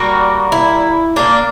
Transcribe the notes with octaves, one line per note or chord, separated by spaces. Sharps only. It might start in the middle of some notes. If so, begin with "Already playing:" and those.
Already playing: A#2 G3 A#3 F#4
E4
A#2 A#3 D4